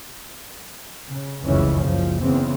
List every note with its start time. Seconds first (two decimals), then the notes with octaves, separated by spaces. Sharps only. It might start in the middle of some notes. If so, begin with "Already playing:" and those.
1.11 C#3
1.45 F1 C#2 F#2 C#3 E3 C#4
1.83 F#1 C#2 F3
2.21 E2 C#3 E3 C4